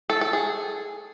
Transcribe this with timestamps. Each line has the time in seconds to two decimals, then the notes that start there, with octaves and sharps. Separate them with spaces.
0.10 A4
0.21 A4
0.33 G#4